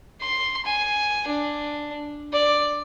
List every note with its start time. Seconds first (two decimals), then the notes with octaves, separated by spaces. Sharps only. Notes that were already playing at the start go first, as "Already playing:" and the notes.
0.21 C6
0.65 G#5
1.27 D4
2.32 D5